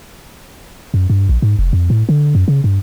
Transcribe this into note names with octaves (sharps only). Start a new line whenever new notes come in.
F#2
G2
A#1
G#2
F1
F2
A2
D3
F#2
C#3
G2